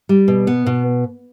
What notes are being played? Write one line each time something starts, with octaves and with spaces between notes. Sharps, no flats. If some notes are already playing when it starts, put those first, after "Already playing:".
G3
B2
B3
B2